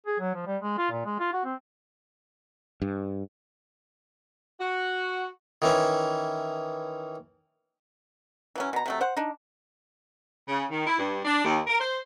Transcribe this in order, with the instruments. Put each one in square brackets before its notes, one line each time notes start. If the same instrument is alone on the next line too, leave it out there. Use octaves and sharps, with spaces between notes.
[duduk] G#4
F#3
F3
G3
G#3
F4
A#2
G#3
F4
F#4
C4
[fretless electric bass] G2
[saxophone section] F#4
[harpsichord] D#3 E3 C#4
[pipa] E3 F#3 C#4
B2 A#5
C3 F#3 A3
C5 F#5
D4 D#4
[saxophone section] C#3
D#3
E4
G2
D4
D#2
A#4
C5